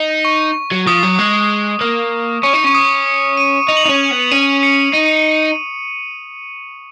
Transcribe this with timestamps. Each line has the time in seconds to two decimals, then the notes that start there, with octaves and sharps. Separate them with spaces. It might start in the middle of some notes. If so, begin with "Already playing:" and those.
Already playing: D#4
0.25 C#6
0.71 F#3
0.87 F3 D#6
1.03 F#3
1.18 G#3
1.81 A#3
2.43 C#4 C#6
2.54 D#4
2.65 C#4 C#6
2.75 D#6
3.06 C#7
3.37 D#7
3.69 D#4 F7
3.77 F#7
3.84 D#4 F7
3.89 C#4
4.11 B3
4.31 C#4 D#7
4.63 C#7
4.94 D#4 D#7